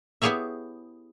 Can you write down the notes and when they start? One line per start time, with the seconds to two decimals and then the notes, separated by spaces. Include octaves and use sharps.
0.22 B3 E4 G4 G#4 C#5 E5